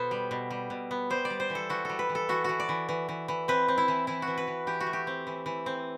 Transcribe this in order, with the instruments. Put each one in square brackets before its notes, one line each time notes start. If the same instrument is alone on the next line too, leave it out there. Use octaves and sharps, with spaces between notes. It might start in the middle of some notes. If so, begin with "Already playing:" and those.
Already playing: [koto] B2 B3 A4 C5
G3
B2
G3
B2
B3
G3 C5
D5
G3
C5
E3
A4
E3 F#4
G3 A4
B4
E3
A4
E3 F#4
E3 F#4
D5
E3
E3
E3
E3
C4 B4
C4
E4
E3
E3 E4
F#4
E3
B4
E3
E3 G4
F#4
A3
G4
C4
E3
E3
C4